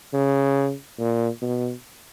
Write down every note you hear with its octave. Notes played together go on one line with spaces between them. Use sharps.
C#3
A#2
B2